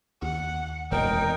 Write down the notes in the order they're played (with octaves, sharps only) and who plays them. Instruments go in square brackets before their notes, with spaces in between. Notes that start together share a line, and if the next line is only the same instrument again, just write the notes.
[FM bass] D#2 [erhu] F#5
[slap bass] E1 F2 [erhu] D#4 [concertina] A#4 G5